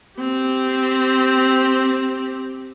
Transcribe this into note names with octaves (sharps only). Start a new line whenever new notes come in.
C4 G4